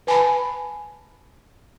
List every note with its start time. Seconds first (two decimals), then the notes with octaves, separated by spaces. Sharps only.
0.07 B4 G#5 A5 B5